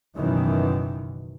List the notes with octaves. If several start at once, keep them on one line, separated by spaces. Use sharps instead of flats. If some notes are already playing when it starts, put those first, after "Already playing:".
F#1 F#2 B2 D#3 E3